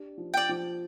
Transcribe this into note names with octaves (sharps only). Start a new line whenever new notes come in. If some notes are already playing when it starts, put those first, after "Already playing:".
Already playing: D4 G4
F3
D5 G5
F3